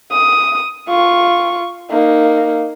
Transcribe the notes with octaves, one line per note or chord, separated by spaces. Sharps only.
D#6
F4 C#6
A#3 D#4